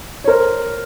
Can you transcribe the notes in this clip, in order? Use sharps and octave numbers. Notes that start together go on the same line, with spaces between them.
C#5
A#4 C5